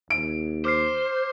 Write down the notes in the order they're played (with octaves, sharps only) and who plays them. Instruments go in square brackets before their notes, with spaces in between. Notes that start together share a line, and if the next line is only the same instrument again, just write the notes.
[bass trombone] D#2 [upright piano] D7
[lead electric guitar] C5 [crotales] D6 F6 C7